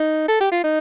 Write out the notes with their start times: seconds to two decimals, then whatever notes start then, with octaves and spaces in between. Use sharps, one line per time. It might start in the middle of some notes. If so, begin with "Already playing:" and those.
Already playing: D#4
0.28 A4
0.40 G4
0.51 F4
0.64 D#4